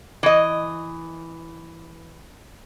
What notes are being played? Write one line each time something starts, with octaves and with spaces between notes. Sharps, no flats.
E3 D#5